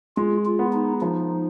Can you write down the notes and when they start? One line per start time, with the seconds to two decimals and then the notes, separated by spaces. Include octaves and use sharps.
0.17 G#3 F4
0.46 F4
0.59 B3
0.73 D#4
1.01 F3 D#4